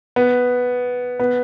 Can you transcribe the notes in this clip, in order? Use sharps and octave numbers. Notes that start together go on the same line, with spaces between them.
B3
B3